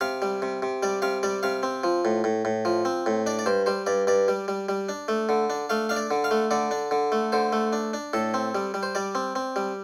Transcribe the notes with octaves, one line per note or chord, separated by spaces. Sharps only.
C3 F5
G3
C3
C3
G3 D5
C3 F5
G3 D5
C3 F5
C4
F3
A2
A2
A2
F3
C4
A2
D4 D5
D5
G2 C5
G3 C5
G2 D5
G2 D5
G3
G3
G3
D4
A3
D3
D4
A3 F5
D4 F5
D5
D3
F5
A3
D3 D5
D4
D3
A3
D3 C5
A3
D4
D4
A2 A4
C4
G3
G3
C5
G3 D5
C4
C4
G3